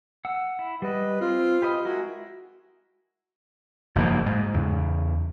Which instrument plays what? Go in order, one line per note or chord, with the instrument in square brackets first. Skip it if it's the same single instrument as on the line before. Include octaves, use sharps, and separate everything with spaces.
[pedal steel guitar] F#5 E6
E4
[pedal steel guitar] G3 D#5 [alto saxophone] B4
[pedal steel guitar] C4 [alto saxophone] F4
[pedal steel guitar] G4 B4 D#5
[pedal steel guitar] G#3 E4 A#4 [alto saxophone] F#4
[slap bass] F#1 G#2 F3 A#3
G#2
E2 C#3